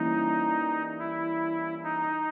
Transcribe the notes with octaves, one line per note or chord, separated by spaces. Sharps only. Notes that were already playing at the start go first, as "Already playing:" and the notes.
Already playing: E3 G3 A#3 C#4 D#4
E4
D#4